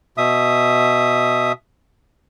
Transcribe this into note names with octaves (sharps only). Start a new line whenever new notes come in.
B2 E5 D#6